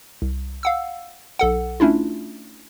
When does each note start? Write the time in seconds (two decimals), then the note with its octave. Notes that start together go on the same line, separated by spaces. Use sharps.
0.22 C2
0.63 F5 F#5 E6
1.39 B1 A4 F#5
1.80 A3 C#4 D4 E4 F4